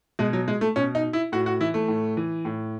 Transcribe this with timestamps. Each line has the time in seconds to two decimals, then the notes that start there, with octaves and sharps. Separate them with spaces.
0.19 B2 G#3
0.33 F#3
0.48 G#3
0.61 A3
0.76 B2 C#4
0.95 D#4
1.13 E4
1.32 A2 F#4
1.46 F#4
1.60 E3 E4
1.74 A3
1.88 A2
2.17 E3
2.45 A2